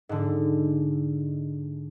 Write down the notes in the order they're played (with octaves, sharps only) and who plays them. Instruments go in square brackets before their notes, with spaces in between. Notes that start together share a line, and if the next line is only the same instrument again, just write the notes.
[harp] G#2 D3